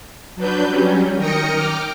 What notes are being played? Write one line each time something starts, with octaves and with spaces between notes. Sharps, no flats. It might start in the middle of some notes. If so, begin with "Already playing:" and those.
F#3 D4 B4 G6
F#3 G3 C#4
D#3 A#4 G5 D#6 A#6 C#7
G5 D6 F6